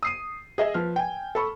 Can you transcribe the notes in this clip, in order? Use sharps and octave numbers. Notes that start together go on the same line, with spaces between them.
D#6 C7 D#7
G#4 D#5 E5
F3 B4 F6
G5 G#5
A4 B5 C#6